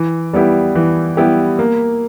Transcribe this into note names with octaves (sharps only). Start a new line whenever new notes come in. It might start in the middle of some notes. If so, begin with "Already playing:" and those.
Already playing: E3
G3 B3 E4 G4
E3
G3 B3 E4 G4
A#3